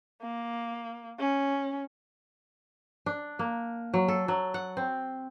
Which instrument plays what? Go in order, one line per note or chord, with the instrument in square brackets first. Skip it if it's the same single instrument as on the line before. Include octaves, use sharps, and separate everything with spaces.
[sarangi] A#3
C#4
[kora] D4
A#3
F#3
A4
F#3
F#5
C4